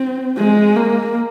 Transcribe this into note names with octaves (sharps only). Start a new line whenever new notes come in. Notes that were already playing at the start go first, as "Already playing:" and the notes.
Already playing: C4
G#3
A#3